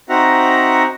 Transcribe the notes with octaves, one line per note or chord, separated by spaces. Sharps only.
C4 D#4 F#4 E5 F#5 A#5